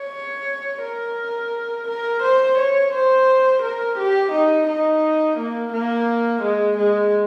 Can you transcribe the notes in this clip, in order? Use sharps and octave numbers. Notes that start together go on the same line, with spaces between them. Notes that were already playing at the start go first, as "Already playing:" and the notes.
Already playing: C#5
A#4
A#4
C5
C#5
C5
A#4
G4
D#4
D#4
A#3
A#3
G#3
G#3